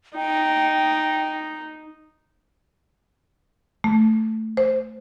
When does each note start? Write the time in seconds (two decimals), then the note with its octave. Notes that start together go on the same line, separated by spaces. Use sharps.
0.16 D#4 G5
3.84 A3
4.57 C5